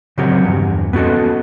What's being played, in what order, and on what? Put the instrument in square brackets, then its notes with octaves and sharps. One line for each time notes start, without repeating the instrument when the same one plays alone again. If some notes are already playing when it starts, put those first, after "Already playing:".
[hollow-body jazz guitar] C#3 F#3 C4 F#4 G4 A#4
E2 G2
B3 C#4 E4 F#4 A4 D#5